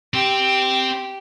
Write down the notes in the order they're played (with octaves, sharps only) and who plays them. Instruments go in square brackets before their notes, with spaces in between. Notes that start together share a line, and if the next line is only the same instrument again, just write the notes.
[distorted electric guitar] C4 [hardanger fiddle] G4